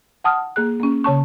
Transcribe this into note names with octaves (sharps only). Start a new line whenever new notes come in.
F#5 A5 D#6 F6
A#3 G#4 F#6
A#3 C#4
C#3 C#5 A5 C#6